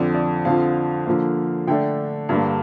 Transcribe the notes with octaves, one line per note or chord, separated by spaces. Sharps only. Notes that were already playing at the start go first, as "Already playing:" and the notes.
Already playing: F2 D3 F3 D5
D5
F2 D3 F3 F5
D3 F3 A#3
D3 A3 D4 G5
G2 D3 G3 A#3